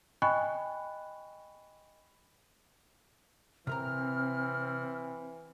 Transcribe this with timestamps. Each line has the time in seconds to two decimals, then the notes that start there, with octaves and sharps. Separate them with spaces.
0.22 D#5 G5 G#5 B5 C#6 F#6
3.67 C3 E3 C4 A#4 A#5 F6